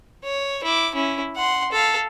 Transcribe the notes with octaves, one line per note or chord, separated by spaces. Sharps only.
C#5
E4 D6
C#4 E4
F#5 C6
A4 F5